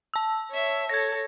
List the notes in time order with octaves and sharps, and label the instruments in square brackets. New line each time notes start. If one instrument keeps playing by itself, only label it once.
[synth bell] A5 E6
[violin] C#5 E5
[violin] A4 C#5 [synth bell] G#6 A#6